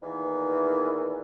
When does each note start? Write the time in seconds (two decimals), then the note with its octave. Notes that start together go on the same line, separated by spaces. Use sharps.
0.03 E2 A#2 D#3 E3